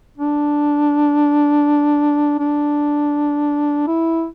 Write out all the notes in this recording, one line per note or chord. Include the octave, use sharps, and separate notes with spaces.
D4
D4
E4